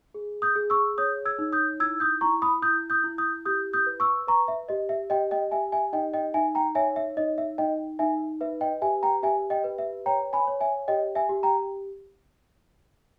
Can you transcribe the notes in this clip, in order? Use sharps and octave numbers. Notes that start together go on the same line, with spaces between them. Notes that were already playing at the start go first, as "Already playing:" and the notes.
G#4
D#6 G6
G#4
C#6 E6
C#5 D#6 G6
E6 G#6
D#4
D#6 G6
E4 E6 G#6
D#6 G6
E4 A#5 C#6
B5 D#6
E4 D#6 G6
D#6 G6
E4
D#6 G6
G4 D#6 G6
D#6 G6
B4
C#6 E6
B4 A#5 C#6
E5
G4 D#5
E5
G4 D#5 G5
D#5 G5
G4 E5 G#5
E5 G#5
D#4 D#5 G5
D#5 G5
D#4 E5 G#5
G5 A#5
C#5 E5 G#5
E5
D#4 D#5
E5
D#4 D#5 G5
D#4 E5 G#5
B4 E5
D#5 G5
G4 E5 G#5
G5 A#5
G4 E5 G#5
D#5 G5
B4
E5
C#5 G5 A#5
G#5 B5
C#5
E5 G#5
G4 D#5 G5
E5 G#5
G4
G5 A#5